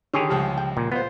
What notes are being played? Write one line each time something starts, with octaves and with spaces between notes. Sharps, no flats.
D3 D#3 G4 G#4 C#5
C#2 F3 G3
G5
A#2
B3 F4 C5